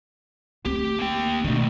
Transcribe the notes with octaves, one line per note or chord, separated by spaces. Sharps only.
D2 C4 G4
A#3 G5
B2 D#3 A3 D4